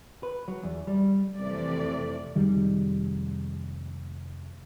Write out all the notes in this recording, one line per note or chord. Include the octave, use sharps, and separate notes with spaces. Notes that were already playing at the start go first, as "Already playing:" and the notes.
B4
F#3
E2
G3
F2 C3 E3 A3 D5
F1 D#3 G3 G#3